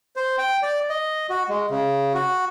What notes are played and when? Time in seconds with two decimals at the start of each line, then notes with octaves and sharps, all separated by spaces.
0.16 C5
0.38 G5
0.63 D5
0.90 D#5
1.30 F#4
1.49 G#3
1.71 C#3
2.14 F#4